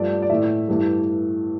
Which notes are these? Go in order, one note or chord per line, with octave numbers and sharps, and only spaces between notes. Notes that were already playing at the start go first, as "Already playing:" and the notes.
Already playing: G2 F3 A3 D5
D5
A2 E3 A3 E5
G2 E3 A3